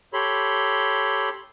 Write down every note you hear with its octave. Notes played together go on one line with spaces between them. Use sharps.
G4 A4 C#5 B5 C6